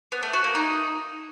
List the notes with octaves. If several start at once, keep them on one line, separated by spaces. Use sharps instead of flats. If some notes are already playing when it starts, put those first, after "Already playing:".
B3
A3
F#4
A#3
D#4